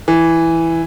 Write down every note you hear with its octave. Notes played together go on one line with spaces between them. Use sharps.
E3